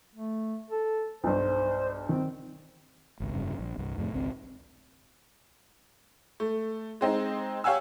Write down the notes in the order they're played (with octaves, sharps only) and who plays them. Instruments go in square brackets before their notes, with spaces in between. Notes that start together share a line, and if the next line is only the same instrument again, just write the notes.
[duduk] A3
A4
[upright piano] B1 G2 [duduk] C5
[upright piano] D#3 [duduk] C4
[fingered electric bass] G#1 C#2
F1 G2 C#3
A#1
C2 G2
F2 A2 C3
G#1 C#2 C4
[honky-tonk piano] A3
G#3 C4 D#4
G4 C#5 F5 F#5 G#5 E6